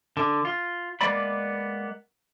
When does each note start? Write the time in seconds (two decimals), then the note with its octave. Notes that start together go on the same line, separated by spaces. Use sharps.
0.17 D3
0.45 F4
1.01 G#3 A#3 B3 B4 D5 B5